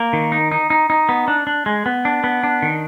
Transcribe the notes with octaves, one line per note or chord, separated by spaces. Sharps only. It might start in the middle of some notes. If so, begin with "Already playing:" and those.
Already playing: A#3
D#3
D#4
D#4
D#4
D#4
B3
D4
D4
G#3
B3
D4
B3
D4
D#3